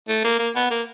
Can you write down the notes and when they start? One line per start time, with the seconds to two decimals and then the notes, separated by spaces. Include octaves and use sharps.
0.08 A3
0.24 A#3
0.39 A#3
0.55 B3
0.71 A#3